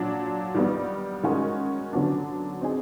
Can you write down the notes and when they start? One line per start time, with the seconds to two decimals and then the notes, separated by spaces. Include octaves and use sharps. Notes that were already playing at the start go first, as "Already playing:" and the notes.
Already playing: A#2 F#3 D4
0.55 D#3 G3 B3
1.23 D#3 G#3 C#4 F#4 A#4
1.93 D3 F#3 B3 D4
2.61 C4 D#4 G#4